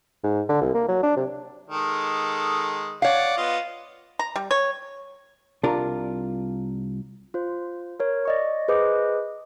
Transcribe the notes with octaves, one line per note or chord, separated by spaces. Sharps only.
G#2
D3
C2
A#3
F#3
D4
C3
D#3 G#3 A4
C#5 D5 F5 F#5
B3 F4 D#5
A#5
G3
C#5
C2 D4 F4 A#4
F4 C5
A#4 C#5
D5 D#5 C#6
G#4 B4 C5 D#5 D6